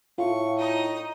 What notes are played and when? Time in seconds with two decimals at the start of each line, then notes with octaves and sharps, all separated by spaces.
0.18 A2 F4 C#6
0.58 D#4 D#5